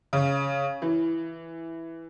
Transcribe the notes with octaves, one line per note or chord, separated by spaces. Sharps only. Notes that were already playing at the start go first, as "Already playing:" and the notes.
C#3
E3